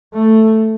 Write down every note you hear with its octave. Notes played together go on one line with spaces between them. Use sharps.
A3